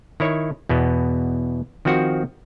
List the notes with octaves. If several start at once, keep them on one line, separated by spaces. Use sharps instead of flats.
D#3 E4 C#5
E2 B2 B3
D#3 F3 C4 F#4